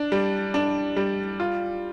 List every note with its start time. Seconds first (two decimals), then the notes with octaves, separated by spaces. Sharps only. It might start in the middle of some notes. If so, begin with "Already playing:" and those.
Already playing: D4
0.12 G3
0.54 D4
0.96 G3
1.40 F4